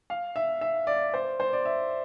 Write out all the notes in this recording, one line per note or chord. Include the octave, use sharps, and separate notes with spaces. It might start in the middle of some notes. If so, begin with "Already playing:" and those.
F5
E5
E5
D5
C5
C5
D5
E5